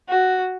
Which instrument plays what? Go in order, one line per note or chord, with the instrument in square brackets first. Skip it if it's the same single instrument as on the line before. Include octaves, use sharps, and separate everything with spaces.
[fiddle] F#4